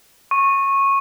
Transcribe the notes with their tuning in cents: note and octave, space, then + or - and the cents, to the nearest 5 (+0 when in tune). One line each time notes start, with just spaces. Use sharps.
C#6 -15